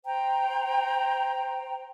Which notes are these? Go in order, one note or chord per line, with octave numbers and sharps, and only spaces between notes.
C5 G5 A#5